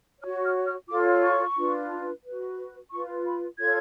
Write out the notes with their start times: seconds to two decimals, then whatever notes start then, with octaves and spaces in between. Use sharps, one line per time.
0.20 C#5 F6
0.24 F#4
0.44 F6
0.66 F6
0.88 F4 A4 C#5 D6
1.22 C#6
1.57 D4 F4 B4
2.23 F#4 B4
2.91 F4 B4 C#6
3.26 B5
3.58 F4 A4 C#5 G#6